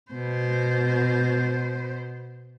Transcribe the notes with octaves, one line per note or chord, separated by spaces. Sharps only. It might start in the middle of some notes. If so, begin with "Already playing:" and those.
B2 C5